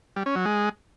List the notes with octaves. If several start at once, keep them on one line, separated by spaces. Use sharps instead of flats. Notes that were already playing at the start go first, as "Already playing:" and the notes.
G3
C#4
F#3
G#3